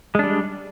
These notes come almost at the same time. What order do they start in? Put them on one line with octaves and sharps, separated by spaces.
G#3 D4 G3